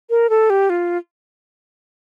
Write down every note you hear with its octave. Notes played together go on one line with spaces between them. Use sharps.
A#4
A4
G4
F4